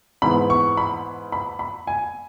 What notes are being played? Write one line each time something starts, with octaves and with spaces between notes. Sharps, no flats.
G#2 E3 B3 B5
C#6
B5
B5
B5
G#5